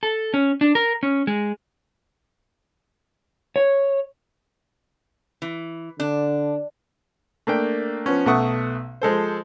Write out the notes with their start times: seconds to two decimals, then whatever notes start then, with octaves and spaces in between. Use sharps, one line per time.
0.03 A4
0.34 C#4
0.61 D4
0.75 A#4
1.03 C#4
1.27 G#3
3.56 C#5
5.42 E3
6.00 D3 D4
7.47 A3 A#3 D4 G5
8.06 F3 B3 C#4
8.26 B1 A3 E5 F#5 C#6 D#6
9.02 F3 G#3 A4 C5